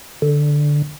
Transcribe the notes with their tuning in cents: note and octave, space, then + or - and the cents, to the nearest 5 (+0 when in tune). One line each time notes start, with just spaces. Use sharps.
D3 +0